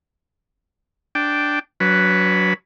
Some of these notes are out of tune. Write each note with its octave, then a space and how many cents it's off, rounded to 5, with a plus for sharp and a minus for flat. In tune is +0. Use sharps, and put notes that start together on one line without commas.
D4 +0 G5 -5
F#3 +0 D4 -40 B4 +0